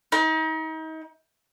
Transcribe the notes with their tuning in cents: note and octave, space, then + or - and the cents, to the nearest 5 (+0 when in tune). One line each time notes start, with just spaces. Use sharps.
D#4 +35